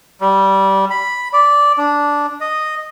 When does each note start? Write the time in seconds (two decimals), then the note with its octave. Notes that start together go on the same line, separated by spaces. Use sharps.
0.21 G3
0.90 B5
1.33 D5
1.78 D4
2.41 D#5